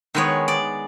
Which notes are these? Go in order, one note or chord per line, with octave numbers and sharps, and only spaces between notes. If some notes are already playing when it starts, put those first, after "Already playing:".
D#3 G#3 B3 C#5
D5